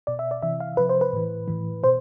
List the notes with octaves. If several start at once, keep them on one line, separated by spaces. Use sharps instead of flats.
B2 D5
E5
D5
C3 E3 E5
F5
C3 F3 B4
C5
B4
A2 E3
A2 E3
B2 C5